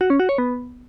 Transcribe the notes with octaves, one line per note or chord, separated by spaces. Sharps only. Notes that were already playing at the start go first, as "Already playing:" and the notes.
F#4
C#4
F#4
C#5
B3